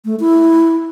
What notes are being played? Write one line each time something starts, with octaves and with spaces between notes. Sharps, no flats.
A3
E4